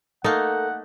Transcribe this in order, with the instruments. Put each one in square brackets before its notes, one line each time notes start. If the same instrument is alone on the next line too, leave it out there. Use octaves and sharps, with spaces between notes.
[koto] A3 A#3 [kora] D#4 [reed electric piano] A4 A#4 [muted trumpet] F#5